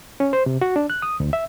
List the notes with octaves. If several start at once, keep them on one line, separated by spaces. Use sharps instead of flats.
C#4
C5
C3
F#4
D4
F#6
D#6
D2
E5